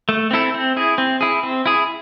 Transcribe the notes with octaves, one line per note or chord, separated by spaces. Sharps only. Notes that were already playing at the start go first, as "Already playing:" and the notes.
A3
C4 E4 A4
C4
E4 G#4
C4
E4 G#4
C4
E4 G#4